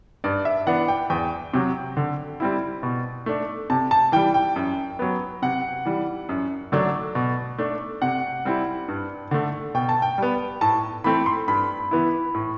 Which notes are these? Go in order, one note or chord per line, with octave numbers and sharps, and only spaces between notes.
G2 D5
E5
E3 B3 D4 F#5
G5
E2 G5
C3 F#3
D3
G3 C4 E4
B2
A3 D4
C3 A5
A5
E3 G3 G5
G5
F#2
F#3 B3
C3 F#5
E3 G3
F#2
D3 F#3 A3 D4
B2
A3 D4
C3 F#5
G3 C4 E4
G2
D3 A3
B2 G5
A5
G5
G3 B3
A2 A5
E3 A3 C4 B5
C6
G2 B5
E3 B3 E4
A2